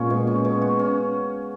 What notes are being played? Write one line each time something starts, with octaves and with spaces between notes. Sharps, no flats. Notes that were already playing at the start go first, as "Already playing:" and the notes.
Already playing: A#2 G#3 C#4 F4
B2
C#4
B2
F#4
C#4